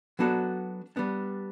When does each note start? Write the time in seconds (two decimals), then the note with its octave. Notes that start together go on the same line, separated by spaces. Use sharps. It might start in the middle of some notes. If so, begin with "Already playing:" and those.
0.19 F#3 B3 D4 F#4 A4
0.96 G3 B3 D4